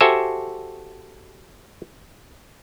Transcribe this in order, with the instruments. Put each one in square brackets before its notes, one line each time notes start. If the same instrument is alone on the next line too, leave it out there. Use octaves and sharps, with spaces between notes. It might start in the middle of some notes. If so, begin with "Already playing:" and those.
[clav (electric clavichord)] F#4 G4 A4 C5 E5 G#5